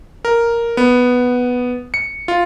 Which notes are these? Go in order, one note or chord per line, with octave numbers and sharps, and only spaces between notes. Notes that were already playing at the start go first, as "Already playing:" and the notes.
A#4
B3
C#7
F4